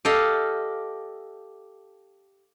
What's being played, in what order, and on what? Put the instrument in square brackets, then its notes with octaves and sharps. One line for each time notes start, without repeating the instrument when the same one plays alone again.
[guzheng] G4 A4 D#5 F5